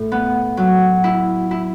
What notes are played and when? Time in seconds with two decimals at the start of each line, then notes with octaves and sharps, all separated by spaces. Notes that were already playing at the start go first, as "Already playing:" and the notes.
Already playing: A2
0.12 B3
0.57 F#3
1.04 E4
1.51 E4